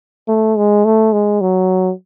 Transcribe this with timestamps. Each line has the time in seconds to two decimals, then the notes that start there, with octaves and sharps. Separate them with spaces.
0.28 A3
0.56 G#3
0.85 A3
1.12 G#3
1.41 F#3